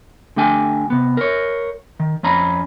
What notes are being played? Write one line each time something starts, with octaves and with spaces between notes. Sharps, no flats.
D3 A3 G4 G5 G#5
C3 B3
A#4 C#5
D#3
F2 C#4 A#5 B5